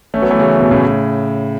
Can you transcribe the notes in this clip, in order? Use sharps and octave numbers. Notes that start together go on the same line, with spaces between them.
A3 C#4
F#3 B3
E3 A3
C#3 F#3
B2
A2 C#3